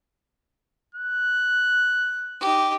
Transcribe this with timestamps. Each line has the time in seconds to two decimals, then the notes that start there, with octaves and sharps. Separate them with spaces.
0.95 F#6
2.41 D#4 G4